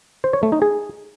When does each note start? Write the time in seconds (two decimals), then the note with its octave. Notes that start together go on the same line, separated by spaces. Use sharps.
0.24 C5
0.33 C#5
0.43 A3
0.52 D#4
0.62 G#4